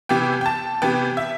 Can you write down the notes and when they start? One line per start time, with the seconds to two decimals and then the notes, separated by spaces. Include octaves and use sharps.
0.09 C3 E3 B3 G5
0.41 G5
0.46 A5
0.82 C3 E3 B3 G5
1.17 E5